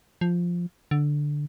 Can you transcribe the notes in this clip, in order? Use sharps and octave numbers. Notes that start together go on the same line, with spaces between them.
F3
D3